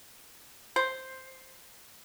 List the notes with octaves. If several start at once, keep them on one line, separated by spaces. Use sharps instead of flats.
C5